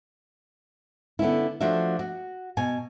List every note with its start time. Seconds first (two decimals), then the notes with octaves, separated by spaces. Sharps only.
1.19 D3 B3 C#4 E4
1.60 F3 A3 D4 F#4 C#5 E5
1.99 F#4
2.57 B2 G#5